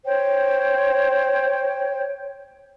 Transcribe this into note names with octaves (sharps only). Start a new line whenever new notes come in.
C5 C#5 G5